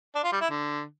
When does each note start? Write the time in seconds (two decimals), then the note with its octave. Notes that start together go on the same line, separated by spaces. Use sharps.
0.15 D4
0.24 F4
0.32 G3
0.41 E4
0.50 D3